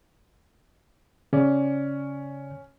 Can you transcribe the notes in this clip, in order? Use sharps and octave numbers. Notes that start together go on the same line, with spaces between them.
C#3 C#4 D5